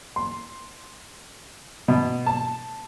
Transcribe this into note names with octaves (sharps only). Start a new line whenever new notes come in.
C6
B2
A5